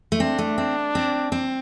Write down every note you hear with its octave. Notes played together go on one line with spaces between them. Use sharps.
A3
C4 D4
A3
C4
C4
C4